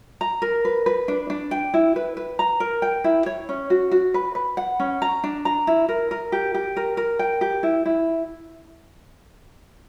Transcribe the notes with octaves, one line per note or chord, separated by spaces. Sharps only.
A#5
A#4
B4
B4
D4
D4
G5
E4
B4
B4
A#5
A#4
G5
E4
C#5
C#4
F#4
F#4
B4
B4
F#5
C#4
A#5
D4
A#5
E4
A#4
A#4
G4
G4
A#4
A#4
G5
G4
E4
E4